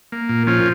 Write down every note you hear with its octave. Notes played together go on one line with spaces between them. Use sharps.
A#3
A#2
F3 C#4 F4